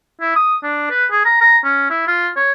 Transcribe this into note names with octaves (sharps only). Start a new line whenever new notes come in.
E4
D#6
D4
B4
G#4
A#5
A#5
C#4
E4
F4
C#5